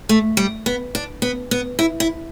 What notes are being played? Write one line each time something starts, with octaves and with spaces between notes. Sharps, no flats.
A3
G3
B3
D4
B3
B3
E4
E4